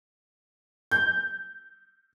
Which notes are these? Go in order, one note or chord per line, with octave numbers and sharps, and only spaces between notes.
G6